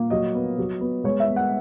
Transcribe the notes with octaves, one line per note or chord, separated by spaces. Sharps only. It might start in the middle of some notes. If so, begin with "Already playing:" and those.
Already playing: A#2 A#3
F#3 D#5
B3
F#3
B3
G#3 C#5
E5
B3
F#5